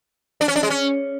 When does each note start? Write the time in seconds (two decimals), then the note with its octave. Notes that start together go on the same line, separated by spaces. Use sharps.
0.41 D4
0.48 C#4
0.56 D4
0.63 G#3
0.70 C#4